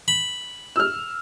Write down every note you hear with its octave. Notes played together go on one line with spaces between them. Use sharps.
B5
E6 F6